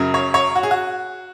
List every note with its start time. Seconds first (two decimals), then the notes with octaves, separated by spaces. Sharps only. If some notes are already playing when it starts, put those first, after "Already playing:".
Already playing: F#2 C#3 F#3
0.14 C#5
0.34 C#5
0.56 F#4
0.63 G#4
0.71 F#4